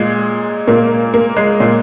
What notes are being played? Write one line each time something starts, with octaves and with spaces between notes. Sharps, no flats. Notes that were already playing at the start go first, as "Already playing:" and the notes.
Already playing: A#2 G#3
A#2 A#3
A#3
G#3
A#2